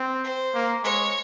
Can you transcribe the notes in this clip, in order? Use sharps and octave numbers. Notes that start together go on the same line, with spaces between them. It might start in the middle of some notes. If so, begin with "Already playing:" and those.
Already playing: C4
C5
A#3
G#3 C#5